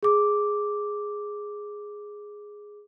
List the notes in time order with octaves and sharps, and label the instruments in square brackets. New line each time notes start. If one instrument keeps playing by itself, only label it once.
[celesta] G#4 D6